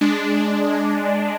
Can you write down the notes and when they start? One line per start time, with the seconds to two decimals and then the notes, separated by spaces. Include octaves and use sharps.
0.01 G#3 D4